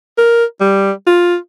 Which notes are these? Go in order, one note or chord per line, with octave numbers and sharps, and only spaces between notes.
A#4
G3
F4